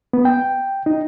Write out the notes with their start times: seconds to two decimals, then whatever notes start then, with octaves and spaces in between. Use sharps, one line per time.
0.13 B3
0.25 G5
0.86 D#4